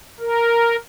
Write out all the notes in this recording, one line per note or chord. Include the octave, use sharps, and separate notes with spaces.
A#4